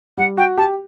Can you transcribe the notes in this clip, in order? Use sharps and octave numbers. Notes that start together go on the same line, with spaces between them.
G3 F#5
F#4 G5
G4 A5